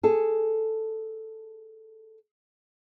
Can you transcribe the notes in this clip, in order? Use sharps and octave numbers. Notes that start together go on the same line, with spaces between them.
G#4 A4